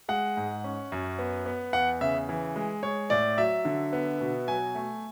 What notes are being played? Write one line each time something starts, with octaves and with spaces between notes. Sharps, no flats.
G#3 F#5
G#2
C#4
F#2
B3
B3
E2 F#5
C#3 E5
E3
G#3
G#3 C#5
A2 D5
F#3 E5
D3
B3
B2
F#3 G#5
A3